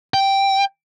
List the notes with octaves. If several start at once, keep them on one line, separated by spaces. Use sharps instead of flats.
G5